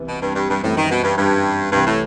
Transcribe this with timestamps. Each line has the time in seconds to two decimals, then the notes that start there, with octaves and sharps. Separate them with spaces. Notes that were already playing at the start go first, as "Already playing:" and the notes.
Already playing: C2 C3 E3 B3
0.09 B2
0.22 G2
0.35 G2
0.50 G2
0.63 F#2 A2 E3 G3 C4
0.77 D#3
0.91 B2
1.04 G2
1.18 G2
1.72 C2 G2 C3 E3
1.87 A2